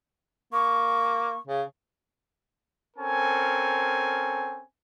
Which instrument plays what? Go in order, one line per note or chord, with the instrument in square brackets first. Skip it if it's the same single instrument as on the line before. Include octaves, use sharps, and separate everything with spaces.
[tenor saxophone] A#3 [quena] C#6
[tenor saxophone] C#3
[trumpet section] C4 C#4 A4 A#4 G#5